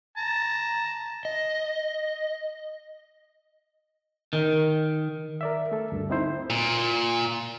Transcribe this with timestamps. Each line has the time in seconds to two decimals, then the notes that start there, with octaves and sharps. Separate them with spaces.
0.17 A5 A#5
1.25 D#5
4.33 D#3
5.41 A#4 D5 E5
5.72 A3 A4
5.92 D2 G2
6.10 C4 D#4 E4 C5
6.50 A#2